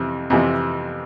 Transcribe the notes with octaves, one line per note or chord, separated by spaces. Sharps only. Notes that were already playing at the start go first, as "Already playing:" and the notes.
Already playing: F2 C3 E3
F2 C3 E3